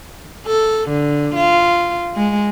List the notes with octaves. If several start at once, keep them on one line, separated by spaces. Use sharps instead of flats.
A4
D3
F4
G#3